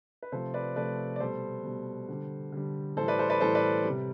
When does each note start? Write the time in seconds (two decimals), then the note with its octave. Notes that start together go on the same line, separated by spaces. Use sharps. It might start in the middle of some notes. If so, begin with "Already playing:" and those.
0.23 B4
0.32 C3 F3 A3 A4 C5
0.54 B4 D5
0.76 C3 F3 A3 B4 D5
1.16 D5
1.20 B2 G3 A4 C5
1.64 B2 G3
2.09 D3 G3
2.52 D3 G3
2.97 A2 E3 G3 A4 C5
3.08 B4 D5
3.19 A4 C5
3.30 B4 D5
3.40 A2 E3 G3 A4 C5
3.55 B4 D5
3.85 G3
3.90 C3